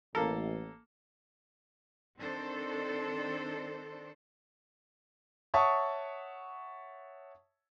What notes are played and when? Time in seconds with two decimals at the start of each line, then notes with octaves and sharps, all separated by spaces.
0.15 A1 A#3 A4 A#4
2.20 D#3 C4 D4 A4 C5
5.54 C#5 E5 F#5 A5 C#6 D#6